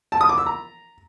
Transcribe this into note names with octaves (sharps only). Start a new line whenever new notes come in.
A5
D#6
D6
E6
A#5